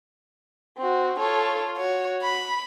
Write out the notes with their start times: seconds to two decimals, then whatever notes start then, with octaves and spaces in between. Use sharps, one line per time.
0.77 C4 F#4
1.19 F4 A4 C#5
1.78 F#4 C#5
2.23 B5